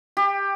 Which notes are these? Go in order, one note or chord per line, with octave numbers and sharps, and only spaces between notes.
G4